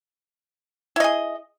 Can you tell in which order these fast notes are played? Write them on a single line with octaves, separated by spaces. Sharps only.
E4 D#5 G#4